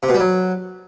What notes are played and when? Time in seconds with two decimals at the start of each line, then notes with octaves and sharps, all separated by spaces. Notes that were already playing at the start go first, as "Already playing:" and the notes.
0.03 C3
0.09 B2
0.14 G3
0.20 F#3